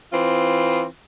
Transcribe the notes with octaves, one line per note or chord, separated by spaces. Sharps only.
E3 C4 F4